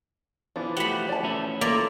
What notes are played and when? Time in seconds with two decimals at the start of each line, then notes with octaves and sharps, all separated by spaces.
0.56 E3 F3 B3 D4
0.77 A3 F#4 G4 F#5 B5
1.09 D5 A5
1.23 A3 C#4 E4
1.61 A#3 F4 A4 D5 B6